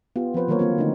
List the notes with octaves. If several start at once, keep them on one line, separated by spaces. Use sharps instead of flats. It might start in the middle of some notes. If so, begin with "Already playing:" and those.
B3 F4 G4
F3 C4 B4 C5
D3 D#3 F#3 A#3 A#4 C#5
A#3 C4 F4
D3 A3 D#4